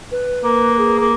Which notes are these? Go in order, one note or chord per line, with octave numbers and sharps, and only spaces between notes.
B4
A#3
G#4
A#3